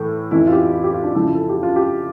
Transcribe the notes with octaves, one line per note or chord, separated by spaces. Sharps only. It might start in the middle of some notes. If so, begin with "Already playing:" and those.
Already playing: A2 E3
F2 E3 E4
F4
G4
F4
G4
F4
D4
F2 C#3 F3 E4
A4
G4
F4
G4